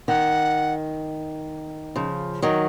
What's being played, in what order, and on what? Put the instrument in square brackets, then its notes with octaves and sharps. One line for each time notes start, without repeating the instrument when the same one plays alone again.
[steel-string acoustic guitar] D#3 [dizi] F#5
[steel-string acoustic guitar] C#3 F3
D#3 F#3